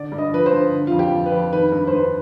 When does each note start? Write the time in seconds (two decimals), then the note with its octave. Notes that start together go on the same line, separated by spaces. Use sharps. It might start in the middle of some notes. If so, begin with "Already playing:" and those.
Already playing: D3 D5
0.12 G2
0.18 D#5
0.32 F3 B4
0.46 C5
0.52 G2
0.72 D3
0.87 F2 F4
0.99 G4
1.13 F3
1.26 B4
1.32 F2
1.53 D#3 B4
1.72 G2
1.87 C5
1.93 G2 B4